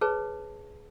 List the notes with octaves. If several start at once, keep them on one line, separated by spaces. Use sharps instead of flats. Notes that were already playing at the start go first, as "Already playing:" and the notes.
G#4 B4 C#5 A5